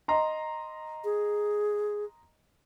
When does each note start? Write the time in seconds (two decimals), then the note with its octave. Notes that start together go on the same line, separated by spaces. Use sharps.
0.08 D#5 A#5 C6
1.05 G#4